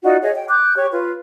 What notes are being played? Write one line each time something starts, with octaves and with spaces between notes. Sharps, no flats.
D#4 F4 F#4 D5
G#4 C#5 D#5 E5
G5
D6 F#6 G6
G4 C#5 C#6
F4 B4